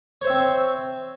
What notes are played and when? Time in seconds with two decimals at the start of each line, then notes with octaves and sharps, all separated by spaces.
0.21 C#5
0.24 C5
0.27 E5
0.30 C4